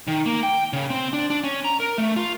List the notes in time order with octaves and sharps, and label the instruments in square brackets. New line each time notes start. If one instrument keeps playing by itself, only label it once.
[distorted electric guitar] D#3
A#3
G5
C#3
C4
D4
D4
C#4
A#5
A#4
A3
F4